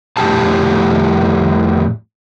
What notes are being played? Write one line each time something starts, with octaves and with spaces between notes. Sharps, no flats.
F2 A2 G4 G#4 A5